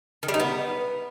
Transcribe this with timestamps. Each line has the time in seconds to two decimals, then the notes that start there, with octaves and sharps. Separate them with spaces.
0.23 D#3
0.28 G3
0.34 D#4
0.40 B3